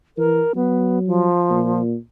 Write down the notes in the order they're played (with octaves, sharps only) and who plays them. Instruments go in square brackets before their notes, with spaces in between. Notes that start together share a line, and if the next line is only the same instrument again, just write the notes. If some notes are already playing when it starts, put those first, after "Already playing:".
[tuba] E3 [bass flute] A#4
[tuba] F#3 [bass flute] B3
[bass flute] F3
[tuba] A#2